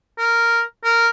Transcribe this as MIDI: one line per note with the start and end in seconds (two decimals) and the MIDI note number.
0.18 0.61 70
0.84 1.08 70